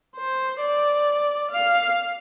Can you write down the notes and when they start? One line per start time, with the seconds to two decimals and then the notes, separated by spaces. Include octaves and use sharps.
0.16 C5
0.61 D5
1.51 F5